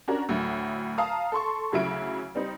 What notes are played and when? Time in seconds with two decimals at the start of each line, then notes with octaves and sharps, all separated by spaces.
0.08 C#4 D4 F#4 A#4
0.29 D2 A2 F#3
0.98 F5 A5 A#5 D#6
1.32 A4 C6 C#6
1.72 D2 C#3 F#3 E4 D7
2.35 G3 C4 D#4